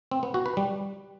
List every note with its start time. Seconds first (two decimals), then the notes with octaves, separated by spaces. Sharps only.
0.11 C4
0.23 B3
0.34 F#4
0.46 B4
0.57 G3